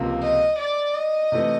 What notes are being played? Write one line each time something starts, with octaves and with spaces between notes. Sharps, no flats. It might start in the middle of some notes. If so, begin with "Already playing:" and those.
Already playing: C#2 C3 F3 A#3
D#5
D5
D#5
C3 E3 A3